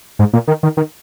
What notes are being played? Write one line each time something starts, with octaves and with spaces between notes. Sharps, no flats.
G#2
A#2
D#3
D#3
D#3